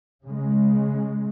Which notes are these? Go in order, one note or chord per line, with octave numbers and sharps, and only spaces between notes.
C#3 G#3